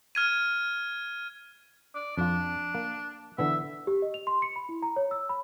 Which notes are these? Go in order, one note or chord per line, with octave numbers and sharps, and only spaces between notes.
F6 G#6 D#7
D5
F2 D4 F4
A#3
D3 E3 B3 E5
G4
D#5
F7
C6
C#7
B5
E4
A#5
C#5
E6
B5